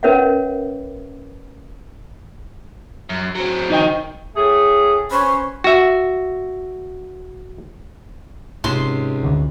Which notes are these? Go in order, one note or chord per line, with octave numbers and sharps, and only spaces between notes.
C#4 A#4 B4 C#5 E5 F#5
F#2
F#3 C4
D#4 D#5 G5
A2 A3 G#4
C#4 B4 C5
F#4 E5
C#2 G#2 C3 C6
D2 D3